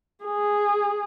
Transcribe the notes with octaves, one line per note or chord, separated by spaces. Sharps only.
G#4